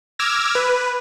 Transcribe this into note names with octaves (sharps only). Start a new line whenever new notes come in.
D6 E6 F6 G#6 A#6
B4